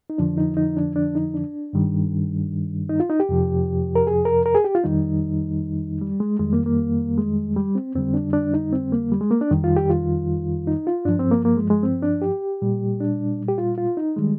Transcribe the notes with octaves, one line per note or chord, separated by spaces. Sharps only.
D#4
F2 D3 F3 D4
D#4
D#4
D4
D4
D#4
D4
G2 D#3 G3
D#4
F4
D#4
G4
F2 C3 F3
A#4
G#4
A#4
A#4
G#4
G4
F4
F2 D#3 G3 D#4
G3
G#3
F2 D#3 G3 G#3
A#3
A#3
G#3
G3
C4
F2 D3 G3 C4
D4
D4
D#4
C4
A#3
G3
G#3
A#3
D4
F2 D#3 G3
F4
G4
F4
D#4
F4
G2 F3 D4
C4
A#3
A#3
G#3
G#3
C4
D4
G4
A#2 G3
D4
G4
F4
F4
D#4
D#3 G3 G#3